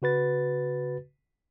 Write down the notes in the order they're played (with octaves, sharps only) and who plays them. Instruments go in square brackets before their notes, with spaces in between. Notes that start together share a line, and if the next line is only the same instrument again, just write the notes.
[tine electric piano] C#3 F#4 B4 A6